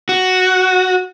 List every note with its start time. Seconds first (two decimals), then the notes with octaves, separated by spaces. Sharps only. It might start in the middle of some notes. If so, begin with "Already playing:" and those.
0.09 F#4